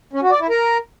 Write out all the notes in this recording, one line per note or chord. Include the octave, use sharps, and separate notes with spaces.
C#4
F#4
D5
E4
A#4